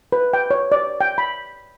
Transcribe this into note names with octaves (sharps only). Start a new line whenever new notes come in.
B4
G5
C#5
D5
G5
B5